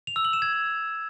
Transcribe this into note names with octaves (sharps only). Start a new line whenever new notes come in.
F7
E6
F#7
E7
G#6